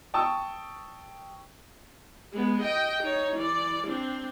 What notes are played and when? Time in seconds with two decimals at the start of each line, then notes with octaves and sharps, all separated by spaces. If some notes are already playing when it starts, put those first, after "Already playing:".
0.14 G5 A5 C#6 D#6 E6
2.32 G#3 B3
2.62 D#5 G5
3.03 D#4 C#5
3.37 E3 D5
3.87 C4 D4